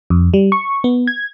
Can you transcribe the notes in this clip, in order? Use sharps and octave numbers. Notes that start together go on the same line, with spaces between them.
F2
G3
C#6
B3
G#6